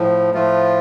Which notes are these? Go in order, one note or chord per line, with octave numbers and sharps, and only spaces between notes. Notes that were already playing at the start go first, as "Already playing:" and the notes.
Already playing: A2 F3
A2 F3 A3 F4